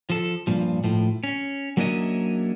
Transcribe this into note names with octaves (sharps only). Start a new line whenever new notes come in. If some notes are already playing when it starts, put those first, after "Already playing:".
F3 A4
G2 A#2 F3
A2 F3
C#4
F#3 A#3 C#4 D4 E4 D#5